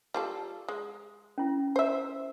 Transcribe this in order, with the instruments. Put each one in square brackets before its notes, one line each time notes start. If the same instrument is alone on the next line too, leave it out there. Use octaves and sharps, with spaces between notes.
[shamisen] G3 F4 A4
G#3
[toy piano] C#4 E4
[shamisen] C5 E5